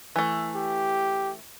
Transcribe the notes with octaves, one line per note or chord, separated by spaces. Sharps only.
E3 A3
G4